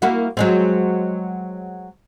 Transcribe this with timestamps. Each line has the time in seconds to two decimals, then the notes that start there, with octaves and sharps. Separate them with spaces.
0.02 A#3 E4 F#4
0.37 F#3 G#3 C4